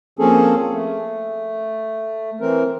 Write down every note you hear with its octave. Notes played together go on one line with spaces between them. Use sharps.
F3 A#3 C4 C#4 G#4 A4
A3
E3 C4 A#4